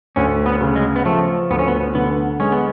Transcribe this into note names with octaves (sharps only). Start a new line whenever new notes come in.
D2 C#4
B3
C#3
G#3
B3
F3 A3
D2 B3
C#4
B3
D3 B3
G#3 C#4
B3